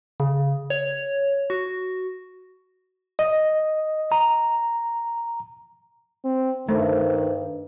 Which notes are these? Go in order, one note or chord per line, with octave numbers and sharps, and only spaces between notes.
C#3
C#5
F#4
D#5
A#5
C4
G2 D#3 A3 C5